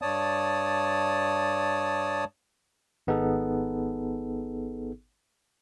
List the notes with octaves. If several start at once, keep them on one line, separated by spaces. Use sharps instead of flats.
G2 C#5 D5 A5 D#6
G#1 B3 D#4 G#4 A4